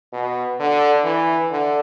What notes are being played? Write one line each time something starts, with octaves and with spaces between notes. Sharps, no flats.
B2
D3
E3
D3